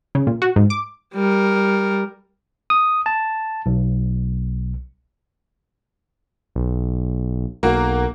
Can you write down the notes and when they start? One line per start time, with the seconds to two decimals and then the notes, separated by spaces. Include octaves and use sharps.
0.15 C#3
0.27 A#2
0.42 F#4
0.56 G#2
0.70 D6
1.14 G3 A#4
2.70 D#6
3.06 A5
3.66 B1
6.55 B1
7.63 B1 A#3 F#4